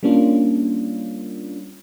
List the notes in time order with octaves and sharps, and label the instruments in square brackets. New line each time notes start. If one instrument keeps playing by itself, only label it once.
[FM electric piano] G3 A#3 C#4 D4 F4